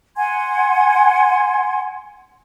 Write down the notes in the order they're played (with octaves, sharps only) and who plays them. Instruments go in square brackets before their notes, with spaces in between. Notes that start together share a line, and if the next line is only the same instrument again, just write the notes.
[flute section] F#5 G#5 C6 G#6